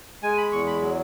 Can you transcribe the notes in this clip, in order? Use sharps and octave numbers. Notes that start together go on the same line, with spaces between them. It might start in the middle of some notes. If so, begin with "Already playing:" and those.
G#3 G#5
B5
E2 C#6
B5
F#3